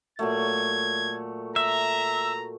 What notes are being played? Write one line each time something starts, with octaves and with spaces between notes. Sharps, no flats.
A#2 F#3 A3 G#6
E5 A#5